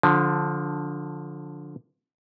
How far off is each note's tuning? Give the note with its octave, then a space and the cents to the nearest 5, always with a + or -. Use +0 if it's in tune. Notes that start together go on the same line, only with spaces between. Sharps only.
D3 +0 F3 +20